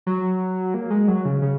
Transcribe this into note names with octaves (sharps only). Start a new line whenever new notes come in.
F#3
A#3
G#3
F#3
C#3
C#3